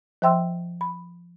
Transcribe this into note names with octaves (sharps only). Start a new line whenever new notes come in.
F3 C5 E5 G5 C6 E6
B5